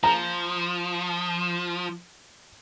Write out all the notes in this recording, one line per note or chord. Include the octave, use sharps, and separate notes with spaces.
F3 A#5